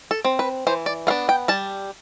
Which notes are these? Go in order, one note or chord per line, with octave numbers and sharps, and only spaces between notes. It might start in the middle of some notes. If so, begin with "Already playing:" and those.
A4
C4
B4
E3 C5
D5
B3 D4 F5
G5
G3 A5